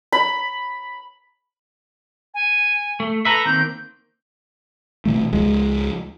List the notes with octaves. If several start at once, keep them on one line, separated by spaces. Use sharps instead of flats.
B5
G#5
A3
A4 B4 E5 A#5
D#3 A#3 C4 G6
B2 E3 A3
C#2 F3 G#3